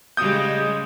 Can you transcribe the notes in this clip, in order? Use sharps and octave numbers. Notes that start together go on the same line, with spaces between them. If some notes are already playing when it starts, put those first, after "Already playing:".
C#3 G3 G#3 D#6 G6